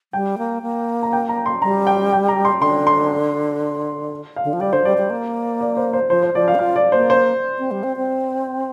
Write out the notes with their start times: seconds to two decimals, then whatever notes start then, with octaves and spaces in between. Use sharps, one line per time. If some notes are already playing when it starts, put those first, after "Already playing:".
0.13 G3 G5
0.38 A#3
0.63 A#3
1.03 A#5
1.13 G5
1.29 A#5
1.46 C6
1.62 G3 A#5
1.87 G5
2.13 G5
2.28 A#5
2.45 C6
2.61 D3 C6
2.87 C6
4.36 F5
4.44 D3
4.53 F3
4.60 G3 D5
4.73 D3 C5
4.85 G3 D5
4.97 G3
5.10 A#3
5.61 D5
5.77 C5
5.93 C5
6.09 F3 C5
6.23 C5
6.34 F3 D5
6.48 F5
6.55 D4
6.59 F4 F5
6.76 D5
6.92 A#3 C5
7.10 C5
7.59 C4
7.71 G3
7.83 C4
7.97 C4